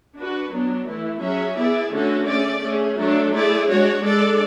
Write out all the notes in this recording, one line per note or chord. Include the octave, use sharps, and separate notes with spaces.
D4 F#4 B4
F#3 B3 D4
E3 A3 E4
F#3 C#4 G#4 C#5 E5
B3 E4 G#4 D5
D3 A3 C#4 F#4 A4
A3 C#4 G#4 D5
A3 C#4 G#4
F#3 A3 D4 A4
A3 E4 G#4 D5
G#3 D4 F#4 C#5
G#3 D4 A4 D5